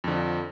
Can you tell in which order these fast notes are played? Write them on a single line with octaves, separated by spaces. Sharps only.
F2 D3 F3